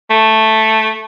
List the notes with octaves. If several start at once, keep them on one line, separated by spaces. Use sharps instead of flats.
A3